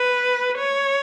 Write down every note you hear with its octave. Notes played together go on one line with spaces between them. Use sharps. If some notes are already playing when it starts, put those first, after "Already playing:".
Already playing: B4
C#5